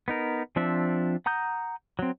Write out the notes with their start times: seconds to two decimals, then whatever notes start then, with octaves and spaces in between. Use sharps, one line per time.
0.08 B3 D#4 A#4
0.56 F3 C4 D4 E5
1.26 F#5 A#5 D#6 G6
1.99 F#3 C4